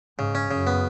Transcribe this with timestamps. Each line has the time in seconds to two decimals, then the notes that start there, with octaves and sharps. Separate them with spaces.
0.19 G#2 C#3
0.35 C#4
0.51 F#2 C#3
0.67 B3